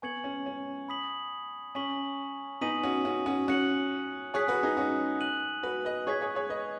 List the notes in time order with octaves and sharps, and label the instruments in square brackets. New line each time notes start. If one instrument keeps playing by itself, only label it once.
[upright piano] B3 [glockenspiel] G#5 C#6 G#6 C#7 F#7
[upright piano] C#4
C#4
[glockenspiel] B5 D#6 B6 F#7
[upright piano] C#4 [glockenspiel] G#5 C#6 B6 F#7
[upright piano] B3 D#4 [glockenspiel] G#5 D#6 B6 D#7 F#7
[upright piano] C#4 F#4
C#4 F#4
C#4 F#4
[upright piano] C#4 F#4 [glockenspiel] F#6 C#7 F#7
[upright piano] G#4 C#5 [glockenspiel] G#5 D#6 F#6 B6
[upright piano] F#4 B4
D#4 G#4
C#4 F#4
[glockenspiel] F#6 D#7 F#7
[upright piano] F#4 B4
B4 D#5
[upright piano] G#4 C#5 [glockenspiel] C#6 G#6 B6
[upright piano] G#4 C#5
G#4 C#5
B4 D#5